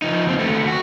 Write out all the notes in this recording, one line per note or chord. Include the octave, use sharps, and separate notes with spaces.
F3 D#4
D#2 C4
D#2 A3
F#4